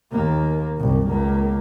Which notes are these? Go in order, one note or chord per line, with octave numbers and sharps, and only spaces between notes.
D#2 A#3
F#1 C2
C#2 A#3